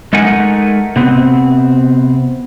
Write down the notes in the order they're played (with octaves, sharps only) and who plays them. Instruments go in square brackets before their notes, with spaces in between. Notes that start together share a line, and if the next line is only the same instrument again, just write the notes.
[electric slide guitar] G#3 A3 D#4 A#4 F#5 G#5
C3 B3 C4